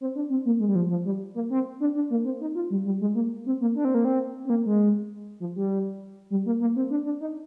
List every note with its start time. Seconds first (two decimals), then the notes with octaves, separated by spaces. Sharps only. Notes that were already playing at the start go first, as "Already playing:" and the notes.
0.01 C4
0.15 D4
0.30 C4
0.45 A#3
0.60 G#3
0.68 G3
0.75 F3
0.90 F3
1.06 G3
1.35 A#3
1.50 C4
1.80 D4
1.95 D4
2.10 A#3
2.25 C4
2.41 D#4
2.55 F4
2.71 G3
2.85 G3
3.01 G#3
3.15 A#3
3.46 C4
3.61 A#3
3.76 D4
3.85 C4
3.95 A#3
4.05 C4
4.45 C4
4.50 A#3
4.66 G#3
5.40 F3
5.56 G3
6.30 G3
6.46 A#3
6.61 A#3
6.76 C4
6.90 D4
7.05 D4
7.21 D#4